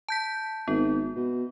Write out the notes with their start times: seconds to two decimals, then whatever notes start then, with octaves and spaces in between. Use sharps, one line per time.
0.09 A5 G6 B6
0.68 G#1 B3
1.15 B2